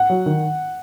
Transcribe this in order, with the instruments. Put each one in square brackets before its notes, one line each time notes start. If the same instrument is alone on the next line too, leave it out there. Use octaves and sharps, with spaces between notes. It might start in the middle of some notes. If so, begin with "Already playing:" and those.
Already playing: [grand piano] F#5
[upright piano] F#3
D#3